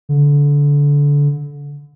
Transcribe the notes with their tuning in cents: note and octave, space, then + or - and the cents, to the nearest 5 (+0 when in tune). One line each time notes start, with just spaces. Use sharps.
D3 -25